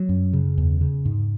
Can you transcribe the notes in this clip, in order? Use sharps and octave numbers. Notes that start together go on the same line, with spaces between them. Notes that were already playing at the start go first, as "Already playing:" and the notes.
Already playing: F#3
F#2
C#3
E2
C#3
G#2